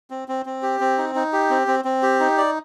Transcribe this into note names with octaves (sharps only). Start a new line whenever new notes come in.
C4
C4
C4
G4
C4
D#4
D#4
G4
C4
C4
C4
G4
D#4
D5